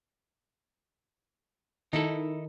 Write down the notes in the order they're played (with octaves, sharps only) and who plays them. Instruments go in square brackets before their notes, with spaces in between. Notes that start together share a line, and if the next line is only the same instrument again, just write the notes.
[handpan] D#3 [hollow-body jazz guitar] D#4 E4 A4